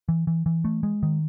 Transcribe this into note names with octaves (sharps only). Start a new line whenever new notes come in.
E3
E3
E3
A3
G#3
D#3